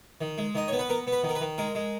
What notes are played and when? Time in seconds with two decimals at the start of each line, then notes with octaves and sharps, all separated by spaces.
0.21 D#3
0.38 G#3
0.55 D#3 D#5
0.68 B3 C#5
0.79 B4
0.89 B3 A#4
1.07 B3
1.12 B4
1.23 D#3
1.29 A#4
1.35 B4
1.41 D#3
1.58 G#3 A#4
1.75 G#3